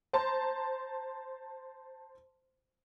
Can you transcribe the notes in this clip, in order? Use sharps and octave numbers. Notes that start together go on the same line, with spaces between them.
C5 A5 A#5 C6